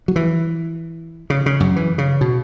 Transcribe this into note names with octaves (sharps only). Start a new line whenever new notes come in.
F#3
E3
C#3
C#3
F#2
E3
C#3
B2